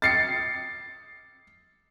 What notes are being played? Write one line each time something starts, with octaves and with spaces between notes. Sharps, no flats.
A6 C7 C#7